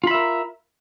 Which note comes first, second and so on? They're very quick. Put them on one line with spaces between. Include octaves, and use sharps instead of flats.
F4 B5 E5 A#4